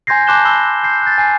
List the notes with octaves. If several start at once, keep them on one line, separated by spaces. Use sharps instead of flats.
G#5 C6 G6 G#6 A#6 C7
A5 C6 D6 F#6 E7 G7
B5 E6 C7 G7
G6 C7
F#6 A6
G#5 C7